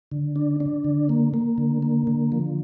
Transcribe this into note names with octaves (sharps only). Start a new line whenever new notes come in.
D3
D4
D4
D3
A#3
A#3
D3
A#3
D3
F3